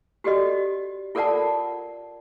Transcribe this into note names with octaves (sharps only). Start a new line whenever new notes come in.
F#4 G4 A4 D5 D#5
F4 A4 A#4 D5 F#5 A5